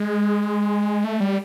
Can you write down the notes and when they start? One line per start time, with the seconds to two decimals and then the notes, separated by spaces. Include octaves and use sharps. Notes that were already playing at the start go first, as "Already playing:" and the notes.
Already playing: G#3
1.04 A3
1.20 G3